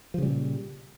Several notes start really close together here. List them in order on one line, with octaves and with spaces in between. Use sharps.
F3 C#3 G3 A#2